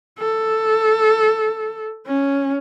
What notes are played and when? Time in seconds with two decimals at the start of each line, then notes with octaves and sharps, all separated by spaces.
0.19 A4
2.07 C#4